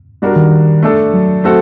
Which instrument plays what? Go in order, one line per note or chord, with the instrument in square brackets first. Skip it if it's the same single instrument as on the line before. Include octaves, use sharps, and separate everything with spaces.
[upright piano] G3 D4 F#4 A#4
[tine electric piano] D#3
[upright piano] A3 D4 A4
[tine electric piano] F#3
[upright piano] A3 C4 F#4 A4